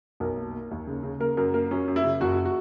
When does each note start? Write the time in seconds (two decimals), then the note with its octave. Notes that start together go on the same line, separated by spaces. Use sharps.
0.20 B1 A#4
0.37 A#3
0.54 A#3
0.71 D#2
0.87 C#3
1.03 C#3
1.20 A#3 A#4
1.37 F#2 A#4
1.54 A#3 A#4
1.71 F#2 C#4
1.88 F#2
1.96 E4
2.04 C#3
2.21 F#1 F#4
2.45 F#4